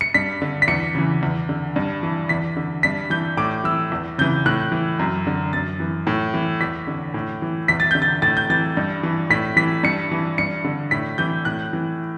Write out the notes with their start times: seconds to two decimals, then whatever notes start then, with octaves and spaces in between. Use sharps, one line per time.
0.01 C#7
0.14 G2 B6
0.42 D3
0.62 B6
0.68 E2 C#7
0.95 C#3 E3
1.23 E2
1.49 D3
1.76 G2
2.03 E3
2.29 E2 B6
2.57 D3
2.83 G2 B6
3.10 E3 G6
3.37 A2 D6
3.64 E3 E6
3.92 E2
4.18 C#3 E3 G6
4.45 A2 F#6
4.72 E3
4.99 F#2
5.27 D3
5.53 F#2 A6
5.80 E3
6.07 A2
6.34 E3
6.61 E2 B6
6.87 D3
7.14 A2
7.42 E3
7.68 E2 B6
7.80 A6
7.91 D3 G6
8.02 A6
8.22 A2 A6
8.37 G6
8.50 E3 A6
8.77 G2
9.03 E3
9.30 A2 B6
9.56 E3 B6
9.83 G2 C#7
10.11 E3
10.38 G2 C#7
10.64 D3
10.91 A2 B6
11.18 E3 G6
11.45 A2 F#6
11.73 E3